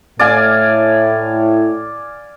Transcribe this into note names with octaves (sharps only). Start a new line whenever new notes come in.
A2 D5 F5 G#5